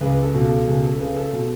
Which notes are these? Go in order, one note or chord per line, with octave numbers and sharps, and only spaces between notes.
C#2 G#4 B4
A4
B2
A4
C#2 G#4
A4
C#3 G#4 B4
A4
B2